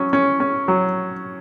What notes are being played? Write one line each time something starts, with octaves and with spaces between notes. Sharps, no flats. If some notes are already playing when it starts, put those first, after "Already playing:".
Already playing: F#3 C#4
C#4
C#4
F#3